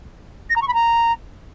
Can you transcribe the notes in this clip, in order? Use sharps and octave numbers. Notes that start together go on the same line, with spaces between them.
A#6
A#5
C#6
B5
A#5